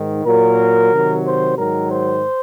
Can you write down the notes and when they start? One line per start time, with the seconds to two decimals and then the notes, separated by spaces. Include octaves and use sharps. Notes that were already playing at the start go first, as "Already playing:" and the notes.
Already playing: G#2 D#3
0.25 A#2 F#3 A#4
0.91 C3 D#3 F#3
1.25 C5
1.57 G#2 D#3 F#3 A#4
1.91 C5